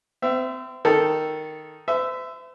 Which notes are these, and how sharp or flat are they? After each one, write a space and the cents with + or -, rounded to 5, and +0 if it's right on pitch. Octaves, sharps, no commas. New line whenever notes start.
C4 -30 E5 +15
D#3 +0 A4 +0
C5 -45 E5 +0